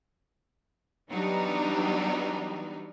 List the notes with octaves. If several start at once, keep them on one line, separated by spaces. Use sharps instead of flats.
E3 F#3 G3 B3 D4 D#4